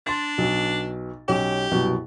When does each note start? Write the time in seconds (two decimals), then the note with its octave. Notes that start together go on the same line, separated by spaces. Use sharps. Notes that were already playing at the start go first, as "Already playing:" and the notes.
0.07 D4 C6 A6
0.38 B1 B2
1.28 B1 C#4 G4
1.71 C2 F#2 B2